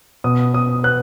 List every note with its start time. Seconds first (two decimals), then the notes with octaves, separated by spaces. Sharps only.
0.24 B2 D#6
0.53 B3 D#6
0.83 B3 F#6